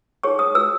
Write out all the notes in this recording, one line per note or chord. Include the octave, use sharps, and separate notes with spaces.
D#4 G#4 C#5 C#6
D#6
F#4 B4 E6